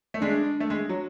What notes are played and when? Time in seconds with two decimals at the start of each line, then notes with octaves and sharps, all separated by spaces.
0.14 A3
0.21 G#3 D4
0.60 A3
0.70 G#3
0.89 F#3